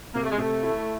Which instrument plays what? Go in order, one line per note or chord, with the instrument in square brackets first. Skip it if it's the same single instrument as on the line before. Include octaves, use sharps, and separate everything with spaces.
[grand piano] C3 [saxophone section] A#3
[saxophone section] A3
G#3
[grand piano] C3 [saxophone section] A3
[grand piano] E4